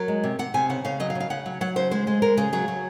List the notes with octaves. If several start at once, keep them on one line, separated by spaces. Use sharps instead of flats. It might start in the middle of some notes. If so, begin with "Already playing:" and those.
Already playing: F#3 A#4
G#3
C3
C3 F#5
C3 G#5
C#3 F#5
C#3 F5
F#3 D#5
F5
C#3
F5
C#3 F#5
F#3
F#3 F#5
C#3 C5
G#3 C5
G#3
G#3 A#4
C#3 G#4
F#3 G#4
F#3